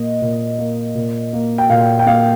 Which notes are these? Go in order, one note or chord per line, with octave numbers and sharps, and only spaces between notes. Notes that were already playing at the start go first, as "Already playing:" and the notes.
Already playing: A#2 A#3 D#5
A#2
A#3
A#2
A#3
G5
A#2 F5
G5
A#3 F5